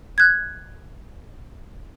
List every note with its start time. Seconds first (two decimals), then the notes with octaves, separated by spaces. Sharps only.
0.18 F#6 G#6